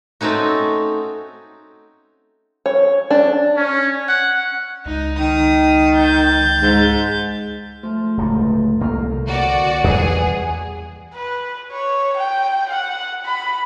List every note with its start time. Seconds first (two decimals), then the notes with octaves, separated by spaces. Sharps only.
0.21 A3 C4 C#4 D#4 F#4
2.66 C#5
3.10 D4
3.57 C#4
4.09 F#5
4.85 C#2 D#4
5.19 D#3 D#6
5.94 G6 A6
6.62 G#2
7.83 F3 A3
8.17 D1 C#2 G2
8.81 C2 C3 A3 A#3 A#4 F5
9.27 D3 F#4 D5
9.84 E2 G3 G#4 B4 F#5
11.14 B4
11.71 C#5
12.17 G5
12.69 F#5
13.25 B5